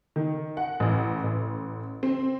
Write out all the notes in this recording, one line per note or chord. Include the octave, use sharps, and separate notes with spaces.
D#3
F#5
A1
A1
C4